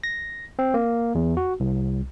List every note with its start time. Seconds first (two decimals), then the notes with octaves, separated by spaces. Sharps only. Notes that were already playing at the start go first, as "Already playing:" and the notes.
0.04 A#6
0.59 C4
0.74 A#3
1.15 E2
1.37 F#4
1.60 C2